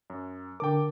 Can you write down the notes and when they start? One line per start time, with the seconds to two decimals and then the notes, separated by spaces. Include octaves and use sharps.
0.10 F#2
0.60 D3 A#4 G5 A5 D6